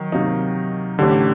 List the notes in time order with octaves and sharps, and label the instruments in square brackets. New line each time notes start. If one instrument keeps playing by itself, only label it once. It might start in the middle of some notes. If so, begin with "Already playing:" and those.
Already playing: [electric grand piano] D#3 [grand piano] F#3
[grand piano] C3 F#3 A#3 D#4
[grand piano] A1 A2 G3 D4 G4 [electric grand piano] D3